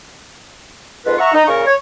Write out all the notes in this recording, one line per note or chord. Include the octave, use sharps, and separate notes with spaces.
F2 G#2 F4 B4
E5 F#5 A#5 C#6
D#4
A#2 C#3 A#4 C#6
C#5